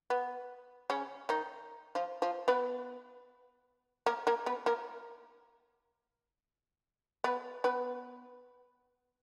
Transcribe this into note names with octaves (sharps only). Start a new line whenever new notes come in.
B3
C#3 C#4
D#3 D#4
F3 F4
F3 F4
B3 B4
A#3 A#4
A#3 A#4
B3 B4
A#3 A#4
B3 B4
B3 B4